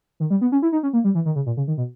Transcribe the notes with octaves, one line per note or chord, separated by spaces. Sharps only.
D#3
G3
B3
C#4
E4
D#4
C#4
A#3
G3
E3
D#3
C#3
A#2
C#3
D#3
B2